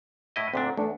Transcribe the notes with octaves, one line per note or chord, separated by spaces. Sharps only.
A2 E4 D#5
D2 A#2 C4 D4
E2 A3 D4